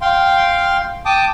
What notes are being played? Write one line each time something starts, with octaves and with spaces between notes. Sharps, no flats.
F5 G5 C6
G5 A5 D6 D#6